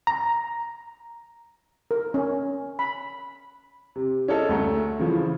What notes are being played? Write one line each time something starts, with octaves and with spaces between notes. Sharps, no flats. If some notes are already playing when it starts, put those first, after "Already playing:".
A#5
A#4
C#4
B5
C3
C#4 G#4 A4 D#5
D2 A3 A#5
C#3 E3 F3